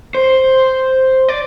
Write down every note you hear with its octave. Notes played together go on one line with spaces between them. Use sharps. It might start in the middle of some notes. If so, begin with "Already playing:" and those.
C5
D5